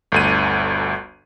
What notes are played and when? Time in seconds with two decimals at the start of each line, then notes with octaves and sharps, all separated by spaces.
0.12 G1 D2 D#7